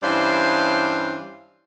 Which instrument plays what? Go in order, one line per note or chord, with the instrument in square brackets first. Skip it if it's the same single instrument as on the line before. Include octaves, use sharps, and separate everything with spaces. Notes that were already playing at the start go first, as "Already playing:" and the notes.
[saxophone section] G2 E3 C#4 C5 D5 F5